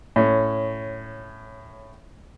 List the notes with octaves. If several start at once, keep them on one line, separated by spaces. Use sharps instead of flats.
A2 C#4